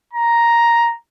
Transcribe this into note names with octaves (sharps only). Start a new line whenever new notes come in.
A#5